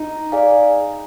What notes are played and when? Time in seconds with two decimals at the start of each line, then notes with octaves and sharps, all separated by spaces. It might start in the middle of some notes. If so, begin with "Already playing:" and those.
Already playing: D#4
0.32 G#4 D5 F5 G#5